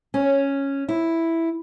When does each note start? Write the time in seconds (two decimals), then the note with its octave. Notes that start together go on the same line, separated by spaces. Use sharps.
0.14 C#4
0.89 E4